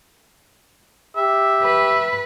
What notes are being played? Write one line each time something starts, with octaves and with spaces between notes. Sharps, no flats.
G4 E5
B4